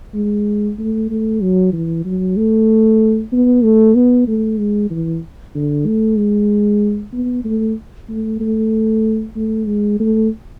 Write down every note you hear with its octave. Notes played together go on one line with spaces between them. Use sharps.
G#3
A3
A3
F#3
E3
F#3
A3
B3
A3
B3
A3
G#3
E3
D3
A3
G#3
B3
A3
A3
A3
A3
G#3
A3